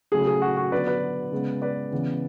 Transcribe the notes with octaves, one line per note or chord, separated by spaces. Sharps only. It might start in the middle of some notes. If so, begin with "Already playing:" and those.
C#3 F#3 A3 G#4
G#4
F#4
F#4
D3 F#3 B3 B4 D5
B4 D5
C#3 G#3 B3
B4 D5
C#3 E3 B3